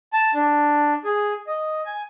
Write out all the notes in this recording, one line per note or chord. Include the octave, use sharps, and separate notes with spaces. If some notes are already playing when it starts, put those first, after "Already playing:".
A5
D4
G#4
D#5
G#5